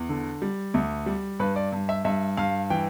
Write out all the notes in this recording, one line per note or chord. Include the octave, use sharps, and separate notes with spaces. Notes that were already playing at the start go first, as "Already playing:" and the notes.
Already playing: E2
D3
G3
D2
G3
G2 B4
D5
G2
E5
G2 E5
G2 F5
E3 G5